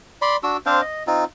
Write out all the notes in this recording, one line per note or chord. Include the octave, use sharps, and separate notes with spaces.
D5 B5 C6
D4 F#4 E6
C4 D4 C5 F5
D#5
C4 D#4 F4